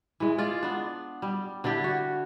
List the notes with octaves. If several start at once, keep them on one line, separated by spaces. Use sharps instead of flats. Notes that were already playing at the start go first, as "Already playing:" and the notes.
E3 G#3
G#3 F4 G#4 D5
B3 D4
G3
D3 D4 E4 G4
F#4